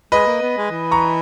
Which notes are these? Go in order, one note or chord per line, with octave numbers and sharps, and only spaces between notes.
G#3 B4 D#5
A#3
B3
G#3
E3
A#5 C#6